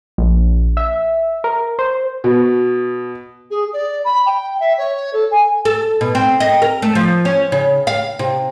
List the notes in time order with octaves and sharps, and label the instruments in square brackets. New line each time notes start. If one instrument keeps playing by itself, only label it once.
[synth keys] A#1
E5
A#4
C5
[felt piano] B2
[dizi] G#4
D5
B5
G5
E5
C#5
A4
G#5
[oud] A4
B2
C4
D#5
A#4
A3
F3
C#4
C#3
F5
C3